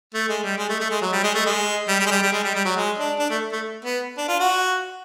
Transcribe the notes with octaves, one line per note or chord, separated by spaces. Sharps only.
A3
G#3
G3
G#3
A3
A3
G#3
F#3
G3
G#3
A3
G#3
G3
G3
G#3
G3
G3
G#3
G3
G3
F#3
G#3
D4
D4
A3
A3
B3
D4
F4
F#4